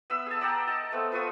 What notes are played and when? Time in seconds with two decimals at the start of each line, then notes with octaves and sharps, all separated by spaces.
0.10 B3 E5 E6
0.27 G#4 A5
0.41 D5 F#5 G5 A#5
0.67 D#5 A5
0.92 A3 B3 C4
1.12 F4 B4 C#6 D#6